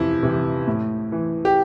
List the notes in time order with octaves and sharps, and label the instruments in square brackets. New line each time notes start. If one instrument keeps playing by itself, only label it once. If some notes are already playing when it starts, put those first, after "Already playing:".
Already playing: [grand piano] F2 C3 E3 E4
C3 E3
A2
E3
G4